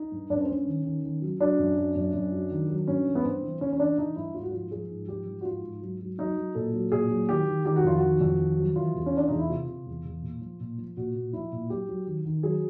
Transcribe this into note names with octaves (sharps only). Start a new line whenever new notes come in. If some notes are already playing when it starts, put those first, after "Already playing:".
Already playing: D#4
G2
G2 D4
C#4
C4
G2 C#4
D#3
D#3
D#3
F#3
F#3 D4
F#2
F#3
F#2
F#2
F#3
D#3
F#3
G2 C#4
E3
B3
G2 C4
E3
E3 C#4
C#4
E3 D4
E3 D#4
G2 E4
G#2 F4
F#4
F3 F4
F3 G#4
G#2
F3 G4
F3
F#4
G#2 F4
G#2
F#3
F#3
F#3 D#4
F#3
A#2 A4
F#3
A#2 G#4
F#3
D#3 G4
D#3
D#3 G4
F#4
F2 F4
F#4
D#3
F2
D#3
F#3
E3 F4
E2
C#4
E3 D4
E2 D#4
E4
C3 F4
C3
E2
E2
A#2
F3
A#2
F3
A#2 F#4
A#2
F3 E4
A#2
F#3 G4
F#3
D#3
D#3
F#3 G#4